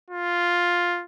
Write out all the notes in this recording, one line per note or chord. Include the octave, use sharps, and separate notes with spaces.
F4